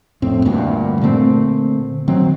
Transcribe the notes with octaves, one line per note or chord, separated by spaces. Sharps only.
F2 A2 C4
G1 D2 G2 A#2
A#2 D3 A3 C4
D#3 F#3 C4